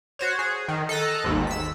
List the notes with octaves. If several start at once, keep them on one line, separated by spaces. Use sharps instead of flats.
F#4 C5 C#5
G#4
D#3
A4 D#5 A#5 F#6
G#1 D#2 G#2
E6 B6